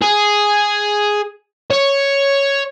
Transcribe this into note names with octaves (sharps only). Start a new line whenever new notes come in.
G#4
C#5